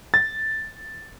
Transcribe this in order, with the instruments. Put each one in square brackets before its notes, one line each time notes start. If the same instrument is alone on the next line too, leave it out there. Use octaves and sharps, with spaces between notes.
[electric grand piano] A6